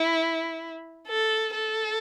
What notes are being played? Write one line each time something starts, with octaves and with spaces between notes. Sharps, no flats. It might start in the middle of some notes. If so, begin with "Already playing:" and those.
Already playing: E4
A4
A4